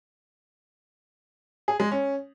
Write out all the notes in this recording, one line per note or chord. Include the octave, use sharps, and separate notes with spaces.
G#4
G#3
C#4